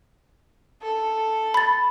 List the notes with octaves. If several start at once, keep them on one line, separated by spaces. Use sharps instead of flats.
A4
B5 A6